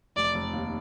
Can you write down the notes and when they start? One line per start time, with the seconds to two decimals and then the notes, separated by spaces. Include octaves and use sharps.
0.16 F1 D5
0.35 F1
0.53 D#2